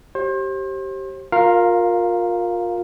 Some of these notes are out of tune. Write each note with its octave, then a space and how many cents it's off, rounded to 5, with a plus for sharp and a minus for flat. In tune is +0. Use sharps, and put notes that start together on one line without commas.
G4 -15 C5 +35
F4 +25 A#4 +0 F5 +0